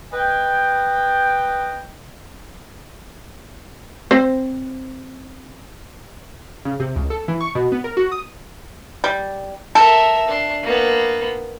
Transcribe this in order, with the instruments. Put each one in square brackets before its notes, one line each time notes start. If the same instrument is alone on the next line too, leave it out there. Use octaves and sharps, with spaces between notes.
[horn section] B4 D#5 G5
[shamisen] C4 C5
[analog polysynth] C#3
C3
C#2
A4
E3
C#6
B2
B3
A#4
F#4
D#6
[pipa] G3
[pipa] A4 [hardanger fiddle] A#4 E5
[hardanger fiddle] D4 C6
A#3 B3